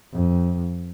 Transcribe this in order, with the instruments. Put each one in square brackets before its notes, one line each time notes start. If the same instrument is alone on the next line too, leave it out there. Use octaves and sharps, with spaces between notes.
[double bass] F2